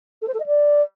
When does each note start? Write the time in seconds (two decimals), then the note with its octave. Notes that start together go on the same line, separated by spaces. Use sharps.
0.22 A4
0.28 C5
0.34 A4
0.40 D#5
0.46 D5